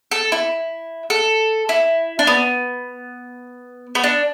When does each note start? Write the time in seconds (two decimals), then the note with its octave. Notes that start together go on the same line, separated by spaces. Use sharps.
0.11 A4
0.32 E4
1.10 A4
1.69 E4
2.19 D4
2.27 B3
3.95 B3
4.04 D4